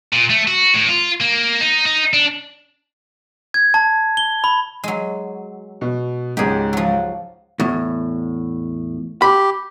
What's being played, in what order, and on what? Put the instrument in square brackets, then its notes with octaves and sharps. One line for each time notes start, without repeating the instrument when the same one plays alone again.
[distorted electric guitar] A#2
A3
F#4
A2
F4
A#3
D#4
D#4
D4
[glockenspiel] G#6
A5
G7
B5
[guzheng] F#3 G#3
[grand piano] B2
[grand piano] C#2 G#2 [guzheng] G4 G#4
[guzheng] F3 F#3
[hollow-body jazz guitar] E2 A2
[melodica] G4 [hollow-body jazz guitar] B5